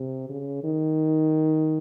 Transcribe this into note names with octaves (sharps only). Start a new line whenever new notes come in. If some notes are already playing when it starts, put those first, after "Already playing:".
Already playing: C3
C#3
D#3